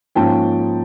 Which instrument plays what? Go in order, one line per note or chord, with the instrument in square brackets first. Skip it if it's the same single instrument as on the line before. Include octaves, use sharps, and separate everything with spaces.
[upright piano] G#2 F3 A#3 C#4 G5 A5